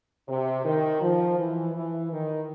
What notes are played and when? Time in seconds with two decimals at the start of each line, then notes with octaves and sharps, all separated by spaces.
0.28 C3
0.65 D#3
1.01 F3
1.38 E3
1.75 E3
2.12 D#3